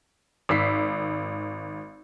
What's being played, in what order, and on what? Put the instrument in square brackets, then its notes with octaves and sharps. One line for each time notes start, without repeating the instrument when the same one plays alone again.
[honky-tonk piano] G#1 E6 B6 C7